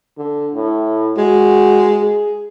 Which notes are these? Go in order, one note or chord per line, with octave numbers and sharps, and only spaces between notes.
D3
A2
G#3 F#4
G#4